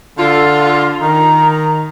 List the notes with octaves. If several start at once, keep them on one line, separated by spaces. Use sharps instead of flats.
D3 F4 A4
D#3 A#5